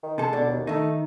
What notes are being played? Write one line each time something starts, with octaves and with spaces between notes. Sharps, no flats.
D#3
C3 G#3 A4
B2 D3 D4
D#2
D#3 A3 D#4